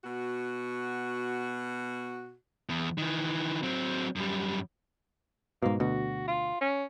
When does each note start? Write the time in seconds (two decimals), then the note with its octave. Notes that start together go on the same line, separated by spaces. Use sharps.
0.03 B2 F#4
2.69 E2
2.98 D#3 E3
3.63 F#3 C4
4.16 F#2 G3
5.63 G#2 B2 A#3
5.80 D2 B2 F#4
6.28 F4
6.61 C#4